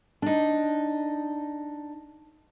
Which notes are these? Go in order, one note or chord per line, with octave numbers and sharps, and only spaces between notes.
D4 D#4